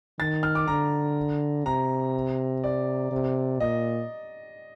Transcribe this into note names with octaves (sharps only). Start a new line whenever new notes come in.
D#3 A6
F6
D6
D3 A#5
C3 A#5
D5
C3
A#2 D#5